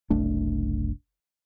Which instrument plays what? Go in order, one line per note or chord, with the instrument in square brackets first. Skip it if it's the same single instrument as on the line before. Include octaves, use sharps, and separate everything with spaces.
[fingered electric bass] F#1 C2 A3 D4